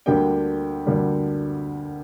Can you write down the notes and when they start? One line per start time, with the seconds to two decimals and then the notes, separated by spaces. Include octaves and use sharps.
0.06 D2 D3 G3 A#3 G4 G5
0.86 D2 D3 G3 A#3